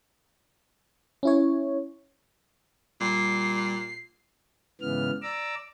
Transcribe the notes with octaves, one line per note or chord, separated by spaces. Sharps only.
C#4 E4 C#5
A#2 G3 C7
G#2 C#3 E3 B3 F6
D5 A#5 D6 E6